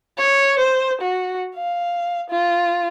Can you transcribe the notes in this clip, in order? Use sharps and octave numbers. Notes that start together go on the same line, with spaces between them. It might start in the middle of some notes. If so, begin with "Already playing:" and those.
C#5
C5
F#4
F5
F4